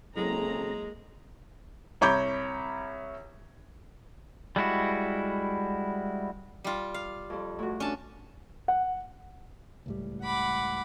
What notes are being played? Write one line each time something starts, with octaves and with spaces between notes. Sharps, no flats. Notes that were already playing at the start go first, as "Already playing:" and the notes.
C#3 F#3 G#3 A#3 C4 E4 A4 A#5
C2 C#5 A#5 B5 D6 G6
G3 G#3 E4 F#4
G3 F4
F5
F2 G3
A2 F#4
C#4 D4 A5
F#5
C#2 A2 G3
F#5 B5 D6